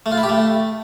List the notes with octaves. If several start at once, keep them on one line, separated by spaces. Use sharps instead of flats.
A3
F4
E4
G4
A3